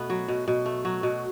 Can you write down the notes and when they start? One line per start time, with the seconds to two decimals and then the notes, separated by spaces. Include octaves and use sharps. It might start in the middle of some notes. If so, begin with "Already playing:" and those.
Already playing: B2 A3 B3
0.10 F#3
0.28 B2
0.48 B2
0.66 A3
0.85 F#3
1.03 B2